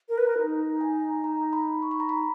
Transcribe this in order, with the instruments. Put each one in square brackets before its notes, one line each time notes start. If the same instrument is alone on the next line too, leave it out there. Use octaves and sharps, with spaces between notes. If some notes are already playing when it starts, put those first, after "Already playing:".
[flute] A#4
B4
A#4
D#4
[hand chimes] G#5
A#5
B5
C#6
B5
A#5
B5